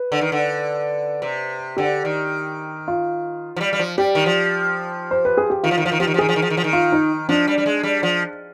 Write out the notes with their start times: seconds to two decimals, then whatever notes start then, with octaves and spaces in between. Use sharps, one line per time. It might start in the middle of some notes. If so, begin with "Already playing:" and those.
Already playing: B4
0.12 D3
0.21 D#3
0.32 D3
1.22 C3
1.77 D3 G4
2.05 D#3
2.88 F4
3.56 F3
3.61 G3
3.73 G3
3.79 F3
3.98 G3 G4
4.15 D#3
4.26 F3
5.11 C5
5.25 B4
5.37 G#4
5.50 G4
5.63 D#3 F4
5.71 F3
5.78 D#3
5.82 F3 F4
5.92 D#3
6.00 F3 G4
6.07 D#3
6.14 F3
6.19 D#3 G#4
6.29 F3
6.36 D#3
6.42 F3
6.50 D#3
6.57 F3
6.64 D#3
6.73 F4
6.92 D#4
7.29 F3 D4
7.48 G3
7.58 G3
7.66 G#3
7.83 G3
8.03 F3